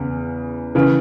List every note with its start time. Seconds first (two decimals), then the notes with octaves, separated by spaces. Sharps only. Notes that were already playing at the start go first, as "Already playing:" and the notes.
Already playing: E2 C#3
0.75 C#3 E3